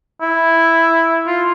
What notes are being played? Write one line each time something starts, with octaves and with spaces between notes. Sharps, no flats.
E4
F4